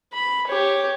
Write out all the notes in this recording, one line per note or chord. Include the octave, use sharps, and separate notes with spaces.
B5
G4 C#5